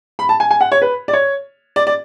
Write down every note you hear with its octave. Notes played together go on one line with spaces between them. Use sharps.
B5
A5
G#5
G#5
F#5
C#5
B4
D5
C#5
D5
D5